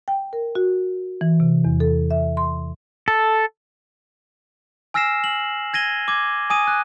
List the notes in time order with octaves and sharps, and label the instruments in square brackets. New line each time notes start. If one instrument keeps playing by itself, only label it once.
[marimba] G5
A#4
F#4
E3
C3
E2
A4
E5
C6
[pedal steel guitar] A4
[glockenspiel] G#5 E6 F6 A#6 C7 E7
F#7
G#6 A#6 D#7 G7
D6 G#6
G#5 D#6 D#7
F#6